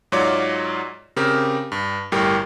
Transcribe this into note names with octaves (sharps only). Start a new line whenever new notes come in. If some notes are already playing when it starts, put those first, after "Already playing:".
G#2 F#3 F4 C#5 D5 D6
C#3 C4 G4 A#4
G2
G1 A2 G3 G4 A#4